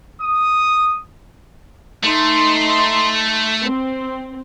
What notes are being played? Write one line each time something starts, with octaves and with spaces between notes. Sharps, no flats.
D#6
A3 D#4 C6
C4